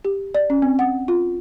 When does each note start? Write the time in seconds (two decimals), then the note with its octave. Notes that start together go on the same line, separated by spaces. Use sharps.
0.05 G4
0.35 D5
0.50 C#4
0.62 C4
0.79 F#5
1.08 F4